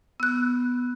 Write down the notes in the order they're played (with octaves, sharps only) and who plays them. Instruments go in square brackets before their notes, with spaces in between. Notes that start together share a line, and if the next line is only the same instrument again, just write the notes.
[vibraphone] B3 [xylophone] E6 F#6